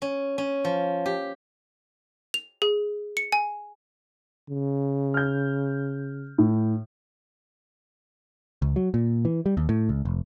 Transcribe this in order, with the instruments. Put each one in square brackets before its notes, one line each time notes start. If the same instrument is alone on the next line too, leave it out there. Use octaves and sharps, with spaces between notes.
[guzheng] C#4
C#4
F3
G4
[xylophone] F7
G#4
C#7
G#5
[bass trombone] C#3
[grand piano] F6 G6
A2
[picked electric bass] C#2
F#3
A#2
E3
G3
D#2
A2
C#2
F1